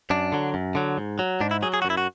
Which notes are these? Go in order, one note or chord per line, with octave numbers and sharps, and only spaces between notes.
F#2 D4
D3 F#3
F#2
D3 F#3
G#2
F#3
G#2 D4
E4
F#3 G#4
G#4
F#4
F#2
E4
F#4